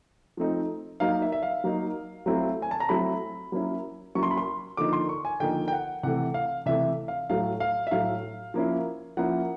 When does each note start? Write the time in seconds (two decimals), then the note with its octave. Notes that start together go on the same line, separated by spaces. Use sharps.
0.37 F3 A3 C4 D#4
1.00 F#3 A#3 D#4 F5
1.22 E5
1.32 E5
1.43 F5
1.64 F#3 A#3 D#4
2.26 F#3 A3 C4 E4
2.62 G#5
2.71 A5
2.80 A#5
2.89 F#3 A3 C4 E4 B5
3.52 F#3 A#3 C#4 E4
4.15 F#3 A#3 C#4 E4 C#6
4.23 C6
4.31 B5
4.38 C6
4.77 D3 F3 A#3 D#4 D6
4.93 C6
5.09 C#6
5.25 G#5
5.40 D3 F3 A#3 D#4 G5
5.68 G5
5.72 F#5
6.03 C3 E3 A3 F#5
6.34 F5
6.66 C3 E3 A3 E5
7.08 F5
7.30 A2 F#3 A3 F5
7.60 F5
7.87 E5
7.91 A2 F#3 A3 F5
8.54 F3 A#3 C#4 E4
9.17 F3 A#3 C#4 E4 F#5